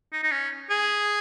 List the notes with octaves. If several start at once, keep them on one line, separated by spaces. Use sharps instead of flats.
D#4
D#4
C#4
G#4